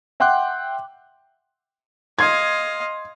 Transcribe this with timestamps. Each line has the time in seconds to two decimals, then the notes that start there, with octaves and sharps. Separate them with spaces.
0.20 E5 F#5 G5 C6 D6 F#6
2.19 D#5 F5 C6 G#6